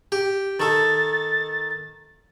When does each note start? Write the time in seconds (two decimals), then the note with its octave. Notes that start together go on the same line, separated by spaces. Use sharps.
0.12 G4
0.60 D#3 A4 A6